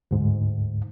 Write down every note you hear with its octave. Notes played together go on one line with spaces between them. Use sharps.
D2 G#2